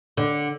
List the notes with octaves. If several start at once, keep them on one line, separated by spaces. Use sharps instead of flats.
D3